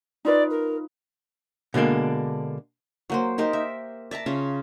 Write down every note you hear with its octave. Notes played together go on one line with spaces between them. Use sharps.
D#4 F4 B4 D5
A#4
B2 D3 G#3 A#3 D4
F#3 A#3 C5
D#4 G4 A#4 C5
E5
D5 E5 A5 A#5
C#3 C#4 F4